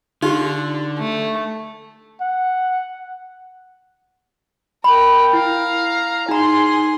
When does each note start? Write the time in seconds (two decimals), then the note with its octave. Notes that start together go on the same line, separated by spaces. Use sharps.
0.23 D3 D#4 F4 G4
0.98 A3
2.21 F#5
4.84 A#4 G5 B5
5.33 E4 F5 A#5
6.29 D#4 G#4 A#5 C6